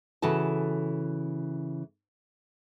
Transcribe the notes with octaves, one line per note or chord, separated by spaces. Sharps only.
C#3 E3 F#4 A4 A5